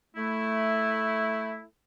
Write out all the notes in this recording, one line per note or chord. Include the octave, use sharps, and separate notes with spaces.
A3 E4